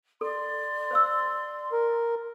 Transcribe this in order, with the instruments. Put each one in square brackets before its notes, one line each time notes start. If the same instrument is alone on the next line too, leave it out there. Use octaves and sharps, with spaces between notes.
[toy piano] A4 [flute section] D5 C6
[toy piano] C5 F5 E6
[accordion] A#4